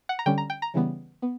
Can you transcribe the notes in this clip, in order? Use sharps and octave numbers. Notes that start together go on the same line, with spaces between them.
F#5
A#5
D3 G3 C#4 G5
A#5
G5
A#5
C#3 E3 G3 B3
B3